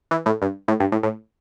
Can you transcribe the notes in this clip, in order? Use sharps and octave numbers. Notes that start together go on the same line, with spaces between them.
E3
A2
G2
A2
G2
A2
A2